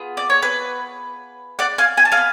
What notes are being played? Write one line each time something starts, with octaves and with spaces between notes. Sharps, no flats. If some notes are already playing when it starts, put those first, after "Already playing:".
Already playing: B3 F4 G#4
D5
C#5
B4
D5 F#5
F5 G#5
G#5
A5
F5 G#5
B3